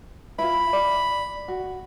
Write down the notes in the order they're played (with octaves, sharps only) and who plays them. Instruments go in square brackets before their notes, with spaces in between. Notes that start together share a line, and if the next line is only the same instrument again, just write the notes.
[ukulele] E4 F4 [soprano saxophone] B5
[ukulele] D5
F#4